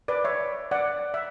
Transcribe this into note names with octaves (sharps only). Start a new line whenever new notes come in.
B4 D5
C#5 E5
D5 F#5
E5